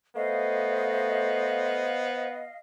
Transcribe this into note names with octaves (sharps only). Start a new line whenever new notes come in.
A3 B3 C5 D#5 F5